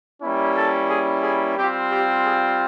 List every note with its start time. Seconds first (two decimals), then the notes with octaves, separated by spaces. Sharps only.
0.23 G3 A#3 C#4 E4
0.57 A4
0.90 G#4
1.23 G#4
1.57 G3 C4 F4 G4
1.91 G4
2.24 G#4